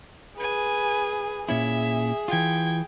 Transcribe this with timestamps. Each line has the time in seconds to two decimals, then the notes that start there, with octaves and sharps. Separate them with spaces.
0.38 G#4 B4 G#5
1.49 A#2 C#4 E4 G#4 E5
2.28 E3 F4 G5 G#6